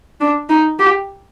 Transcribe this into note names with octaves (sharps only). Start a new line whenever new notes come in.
D4
D#4
G4